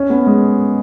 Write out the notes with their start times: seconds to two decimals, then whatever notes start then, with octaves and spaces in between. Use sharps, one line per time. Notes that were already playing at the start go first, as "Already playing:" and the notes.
Already playing: C#4
0.10 B3
0.27 G#3